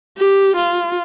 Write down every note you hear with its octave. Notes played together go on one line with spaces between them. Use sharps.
G4
F4